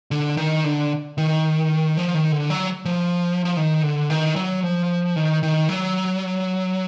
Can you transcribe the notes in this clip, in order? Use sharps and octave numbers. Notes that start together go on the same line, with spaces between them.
D3
D#3
D3
D#3
F3
D#3
D3
F#3
F3
F3
D#3
D3
D#3
F#3
F3
D#3
D#3
F#3